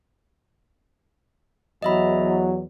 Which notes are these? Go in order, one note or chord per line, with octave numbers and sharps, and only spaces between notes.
E2 F#3 D#5 E5 B5